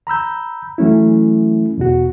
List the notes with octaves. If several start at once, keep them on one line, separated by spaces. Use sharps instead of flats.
A#5 B5 E6 G6
E3 F#3 A3 C#4 E4
E2 B2 F#4